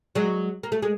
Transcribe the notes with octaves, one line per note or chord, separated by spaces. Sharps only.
F#3 G#3
A#3
A3
G#3